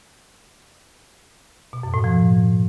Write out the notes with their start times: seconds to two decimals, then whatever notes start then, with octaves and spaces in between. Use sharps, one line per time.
1.73 B2
1.83 F#2
1.94 A2
2.04 F3